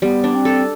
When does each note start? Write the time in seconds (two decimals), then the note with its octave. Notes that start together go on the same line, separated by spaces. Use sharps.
0.02 G3 B3
0.24 D4
0.35 C4
0.45 A4